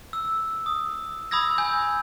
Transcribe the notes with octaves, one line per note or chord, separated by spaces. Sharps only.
E6
D#6
B5 D#6 E6 G#6 A#6
G#5 E6 G6